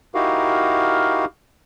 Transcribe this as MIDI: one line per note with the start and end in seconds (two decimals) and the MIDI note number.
0.15 1.25 63
0.15 1.25 64
0.15 1.25 66
0.15 1.25 67
0.15 1.25 70
0.15 1.25 77